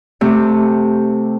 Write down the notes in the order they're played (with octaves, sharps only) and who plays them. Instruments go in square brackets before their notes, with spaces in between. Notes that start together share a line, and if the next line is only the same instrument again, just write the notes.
[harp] C3 A3 G4